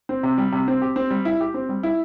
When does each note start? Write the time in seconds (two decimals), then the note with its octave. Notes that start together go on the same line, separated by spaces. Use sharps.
0.09 C4
0.23 C3
0.38 G3
0.52 C3
0.68 C4
0.82 G4
0.96 C4
1.10 G3
1.25 E4
1.40 G4
1.54 C4
1.69 G3
1.83 E4